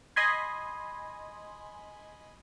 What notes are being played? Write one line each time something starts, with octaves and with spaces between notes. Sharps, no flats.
D#5 G#5 B5 C6 G#6